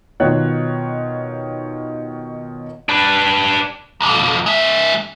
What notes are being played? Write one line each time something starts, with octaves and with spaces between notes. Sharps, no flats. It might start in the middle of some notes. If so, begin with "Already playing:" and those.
B2 D#3 F4 C#5 F#6
D4 B4
B1 F2
G#3 E5